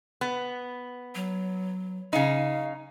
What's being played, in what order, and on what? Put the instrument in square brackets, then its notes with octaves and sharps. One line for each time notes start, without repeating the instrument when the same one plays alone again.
[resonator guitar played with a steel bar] B3
[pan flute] F#3
[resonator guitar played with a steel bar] C#3 D#4 [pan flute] F5